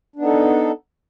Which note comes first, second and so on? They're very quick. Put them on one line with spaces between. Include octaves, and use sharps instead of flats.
D4 B3 D#4 A4